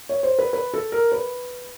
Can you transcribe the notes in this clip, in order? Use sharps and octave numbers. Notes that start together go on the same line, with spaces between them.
C#5
C5
B4
B4
A4
A#4
B4